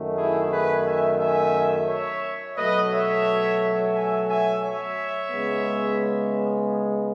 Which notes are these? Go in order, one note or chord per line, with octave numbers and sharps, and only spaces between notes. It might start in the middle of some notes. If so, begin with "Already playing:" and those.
Already playing: F#2 D#3 A3
E4 G#4
G#4 B4
E5 G#5
E5 G#5
C#5 E5
B2 F#3 A3 B4 D#5
C#5 E5
E5 G#5
E5 G#5
C#5 E5
C#3 G#3 B3